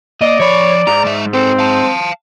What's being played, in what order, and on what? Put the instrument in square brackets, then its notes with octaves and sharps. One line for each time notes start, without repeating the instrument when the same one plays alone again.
[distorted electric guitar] A#3 [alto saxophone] D5 [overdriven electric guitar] D#5
[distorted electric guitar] F3 B5 [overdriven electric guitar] C#5
[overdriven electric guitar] G#2 [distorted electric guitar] A#5
[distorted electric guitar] G#3 E5
[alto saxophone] C4 [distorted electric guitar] G4 A4
[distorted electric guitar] F5 A5